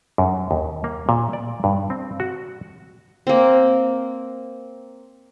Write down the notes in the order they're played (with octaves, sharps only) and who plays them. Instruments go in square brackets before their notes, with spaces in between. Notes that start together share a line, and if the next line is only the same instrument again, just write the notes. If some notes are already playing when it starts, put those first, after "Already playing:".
[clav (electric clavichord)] F#2
D#2
A#3
A#2
D5
G2
C4
F#4
[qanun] A#3 C4